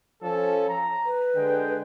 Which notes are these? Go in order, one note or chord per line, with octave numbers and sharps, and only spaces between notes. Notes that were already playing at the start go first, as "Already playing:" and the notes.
F3 C#4 A4
A#5
B4
D3 G#3 G5